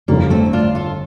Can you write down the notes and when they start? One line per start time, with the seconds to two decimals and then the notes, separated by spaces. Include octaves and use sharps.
0.08 G1 F2 D3 G3 A#3
0.30 A3 C4
0.53 D4 F4
0.75 F4 A4